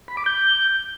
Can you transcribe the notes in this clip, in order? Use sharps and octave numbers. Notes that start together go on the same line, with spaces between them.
B5
D6
G6